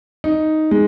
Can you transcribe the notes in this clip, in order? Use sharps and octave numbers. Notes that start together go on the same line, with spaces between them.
D#4
G#3